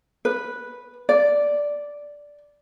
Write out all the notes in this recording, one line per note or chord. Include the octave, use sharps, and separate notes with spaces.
B4
D5